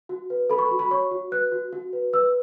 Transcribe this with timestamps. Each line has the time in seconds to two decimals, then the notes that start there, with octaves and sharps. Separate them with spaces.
0.09 F#4
0.30 B4
0.50 A4 B5
0.59 C#6
0.66 B5
0.71 F#4
0.79 B5
0.91 C#5 C#6
1.11 F#4
1.32 B4 F#6
1.52 F#4
1.73 F#4
1.93 B4
2.13 B4 E6